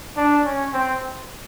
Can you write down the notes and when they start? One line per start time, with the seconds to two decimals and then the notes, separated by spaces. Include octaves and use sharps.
0.17 D4
0.45 C#4
0.74 C4